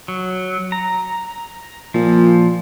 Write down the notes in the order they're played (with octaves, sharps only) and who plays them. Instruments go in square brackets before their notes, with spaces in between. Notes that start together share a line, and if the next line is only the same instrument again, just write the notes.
[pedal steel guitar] F#3
A#5
[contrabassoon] A#2 [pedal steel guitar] F3